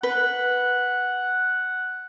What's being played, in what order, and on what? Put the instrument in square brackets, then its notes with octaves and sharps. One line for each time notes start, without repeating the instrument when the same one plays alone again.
[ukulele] B4 [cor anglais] F#5